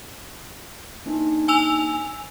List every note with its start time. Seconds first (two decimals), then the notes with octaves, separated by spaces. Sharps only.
1.06 A#3 D4 D#4
1.48 G#5 E6 F7